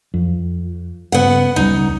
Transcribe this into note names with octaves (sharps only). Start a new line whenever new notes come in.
F2
G2 C#3 B3 F#5
E1 C#2 G3 D#4